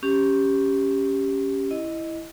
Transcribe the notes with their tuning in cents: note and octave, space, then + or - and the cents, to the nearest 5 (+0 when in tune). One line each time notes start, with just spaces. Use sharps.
C#4 +0 G4 +0
E4 +0 D#5 +0